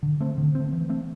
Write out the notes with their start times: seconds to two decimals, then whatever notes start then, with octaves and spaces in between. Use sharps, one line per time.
0.03 D3
0.20 A3 C4
0.38 D3
0.55 A3 C4
0.72 E3
0.89 A3 C4